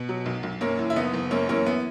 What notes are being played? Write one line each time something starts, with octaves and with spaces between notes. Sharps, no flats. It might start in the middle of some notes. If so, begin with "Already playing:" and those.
Already playing: B2 B3
F#3
B1
B1
F#2 A#3 C#4
E3
E4
F#1 B3 D#4
F#1
F#2 A#3 C#4
E3 A#3 C#4
B3